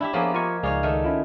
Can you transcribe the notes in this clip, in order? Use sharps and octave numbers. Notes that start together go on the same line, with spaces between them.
D4 E4 G4 E5
F3 A#3 B3 D4 G#4 C#5
F4 A#4 D#5 G#5 C#6
C#2 D#4 G#4 C#5 D5 F5
D#3 A3
C#4 E4 F4